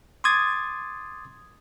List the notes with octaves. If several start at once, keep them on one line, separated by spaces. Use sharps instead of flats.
C6 D6 D#6 G#6 A6